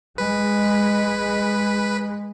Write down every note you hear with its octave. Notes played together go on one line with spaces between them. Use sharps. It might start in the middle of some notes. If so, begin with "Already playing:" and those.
G#3 B4